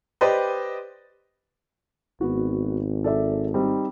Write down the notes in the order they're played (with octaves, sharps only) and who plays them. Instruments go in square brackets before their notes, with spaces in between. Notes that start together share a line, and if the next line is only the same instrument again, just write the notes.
[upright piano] G4 B4 C5 D5 D#5
[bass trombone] G#1 [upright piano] B3 F#4
[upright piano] A4 D5 E5
G3 C4 D#4